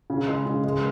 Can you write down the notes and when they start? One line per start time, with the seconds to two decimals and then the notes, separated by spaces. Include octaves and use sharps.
0.10 C#3
0.27 G#3
0.46 C#3
0.64 G#3